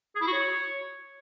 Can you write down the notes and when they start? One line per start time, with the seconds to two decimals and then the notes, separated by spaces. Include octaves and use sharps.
0.16 G#4
0.21 E4
0.27 F#4
0.33 C#5